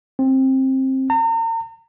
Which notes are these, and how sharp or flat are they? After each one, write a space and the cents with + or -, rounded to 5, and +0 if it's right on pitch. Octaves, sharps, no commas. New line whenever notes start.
C4 +20
A#5 -40